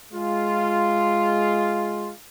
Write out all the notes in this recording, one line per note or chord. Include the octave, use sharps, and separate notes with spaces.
G#3 F4